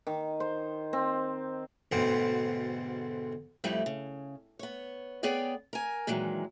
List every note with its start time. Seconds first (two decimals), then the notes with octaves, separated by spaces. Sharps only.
0.07 D#3
0.40 C5
0.93 C4
1.92 D2 G#2 B2 C4
3.64 F2 A2 G3 A3 E4
3.86 C#3
4.59 B3 C#5
5.23 B3 G#4 C#5 D5 G5
5.73 A#4 G#5
6.07 A#2 D#3 E3 F#3 G#3